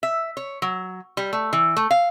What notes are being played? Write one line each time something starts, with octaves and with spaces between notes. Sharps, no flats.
E5
C#5
F#3
G3
A3
E3
A3
F5